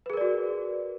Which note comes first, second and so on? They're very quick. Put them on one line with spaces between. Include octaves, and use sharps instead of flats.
B4 G#4 A#4 D5 F#4